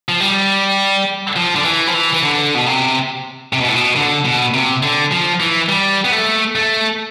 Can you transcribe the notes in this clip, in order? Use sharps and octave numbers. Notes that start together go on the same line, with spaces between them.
F3
G3
F3
D3
E3
F3
E3
E3
D3
B2
C3
C3
B2
A2
B2
D3
B2
C3
D3
F3
E3
G3
B3
A3
A3